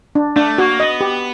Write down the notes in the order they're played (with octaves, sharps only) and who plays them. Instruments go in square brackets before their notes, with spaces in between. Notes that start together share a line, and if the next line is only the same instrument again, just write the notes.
[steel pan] D4
[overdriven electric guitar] A3 [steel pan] D4
[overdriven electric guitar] A#3 [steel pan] F#4
[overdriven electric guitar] B3 [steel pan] D#5
[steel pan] G4